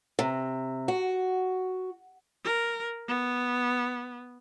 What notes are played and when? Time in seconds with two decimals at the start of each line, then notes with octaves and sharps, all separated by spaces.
0.19 C3
0.88 F#4
2.44 A#4
3.08 B3